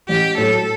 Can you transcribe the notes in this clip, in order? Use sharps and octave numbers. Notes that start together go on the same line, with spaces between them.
A1 G4
A2 F#3 A4